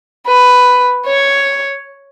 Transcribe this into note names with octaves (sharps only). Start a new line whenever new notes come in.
B4
C#5